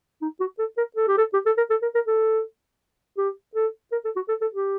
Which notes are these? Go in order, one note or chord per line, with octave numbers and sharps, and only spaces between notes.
D#4
F#4
A4
A#4
A4
G4
A4
G4
A4
A#4
A4
A#4
A#4
A4
G4
A4
A#4
A4
F#4
A4
A4
G4